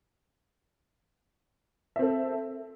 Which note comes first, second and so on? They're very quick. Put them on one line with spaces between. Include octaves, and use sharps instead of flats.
E5 C4 A4